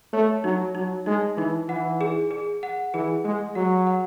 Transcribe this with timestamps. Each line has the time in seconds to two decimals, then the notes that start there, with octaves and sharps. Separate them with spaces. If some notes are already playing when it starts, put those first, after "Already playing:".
0.13 A3 C#5
0.44 F#3 D#4
0.75 F#3 D#4
1.06 G#3 D#4
1.38 E3 D#4
1.68 E3 F#5
2.01 G#4
2.31 G#4
2.63 F#5
2.94 E3 G#4
3.25 G#3 G#4
3.55 F#3 F#5
3.87 F#5